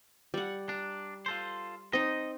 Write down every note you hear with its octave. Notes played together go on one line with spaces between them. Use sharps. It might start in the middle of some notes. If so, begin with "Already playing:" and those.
G3 F#5
D4 A#5
F4 A4 C5
C4 D#4 D#5